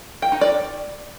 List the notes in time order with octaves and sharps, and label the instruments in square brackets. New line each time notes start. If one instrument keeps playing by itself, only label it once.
[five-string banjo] G5
D#4
D5